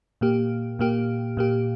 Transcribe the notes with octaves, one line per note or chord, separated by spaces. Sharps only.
A#2 A#3 G4
A#2 A#3 G4
A#2 A#3 G4